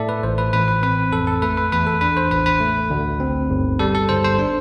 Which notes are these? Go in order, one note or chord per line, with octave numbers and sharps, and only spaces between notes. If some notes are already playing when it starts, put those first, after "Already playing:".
Already playing: A2 A4 D5 E5
B4
A1 C5
B4
A1 B4
B4
C4 B4
F2 A4
A4
A3 B4
B4
E2 B4
A4
D4 B4
C5
A1 B4
B4
A3
D2
C4
G1
G3 A4
A4
G1 C5
C5
D4